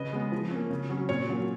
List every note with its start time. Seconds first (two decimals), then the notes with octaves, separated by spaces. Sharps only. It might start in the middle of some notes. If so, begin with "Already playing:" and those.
Already playing: C#3 B4 D#5
0.13 G#3 B3
0.32 F3
0.51 A#3 C#4
0.70 C#3
0.90 F#3 C#4
1.09 A#2 C#5
1.28 F#3 A#3 C#4